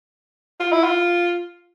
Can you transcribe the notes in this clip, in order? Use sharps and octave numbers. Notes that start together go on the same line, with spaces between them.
F4
E4
F4